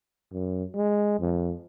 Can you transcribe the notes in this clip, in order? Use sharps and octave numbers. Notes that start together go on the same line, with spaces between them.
F#2
G#3
F2